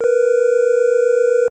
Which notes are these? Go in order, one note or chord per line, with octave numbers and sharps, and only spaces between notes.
A#4 B4